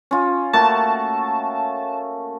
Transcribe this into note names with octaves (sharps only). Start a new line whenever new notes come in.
C#4 F4
A3 A#3 F#4 A5